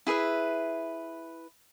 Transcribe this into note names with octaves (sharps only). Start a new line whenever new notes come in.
E4 G#4 B4 E5